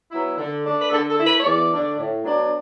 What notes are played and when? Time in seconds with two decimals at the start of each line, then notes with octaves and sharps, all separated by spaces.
0.11 F#3 B3 E4
0.38 D3
0.64 A3 D4
0.81 B4
0.90 D3 A4
1.09 A4
1.18 A3 E4
1.26 B4
1.40 C#5
1.44 E2 D5
1.71 D3 A3 D4
1.98 A2
2.24 F#3 B3 D4